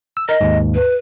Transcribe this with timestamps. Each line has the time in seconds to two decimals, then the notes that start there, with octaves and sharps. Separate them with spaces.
0.17 E6
0.29 A#4 D#5
0.41 D#2 G#2
0.75 B4